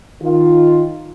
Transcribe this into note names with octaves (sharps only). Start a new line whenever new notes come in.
D#3 F4